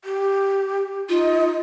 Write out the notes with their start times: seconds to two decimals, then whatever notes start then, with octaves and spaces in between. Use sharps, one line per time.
0.04 G4
1.09 D#4 F4